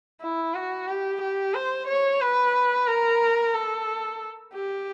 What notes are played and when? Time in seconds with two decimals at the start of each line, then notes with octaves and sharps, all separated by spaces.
0.21 E4
0.54 F#4
0.88 G4
1.21 G4
1.54 C5
1.87 C#5
2.21 B4
2.87 A#4
3.54 A4
4.54 G4